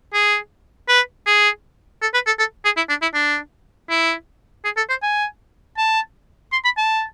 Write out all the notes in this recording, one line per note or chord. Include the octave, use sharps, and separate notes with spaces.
G#4
B4
G#4
A4
B4
A4
A4
G#4
E4
D4
E4
D4
E4
G#4
A4
C5
G#5
A5
C6
B5
A5